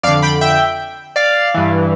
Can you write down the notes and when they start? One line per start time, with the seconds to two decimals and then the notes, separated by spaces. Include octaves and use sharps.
0.03 F2 D5 F5
0.08 D3
0.22 G5 B5
0.41 E5 G5
1.16 D5 F5
1.54 G2 E3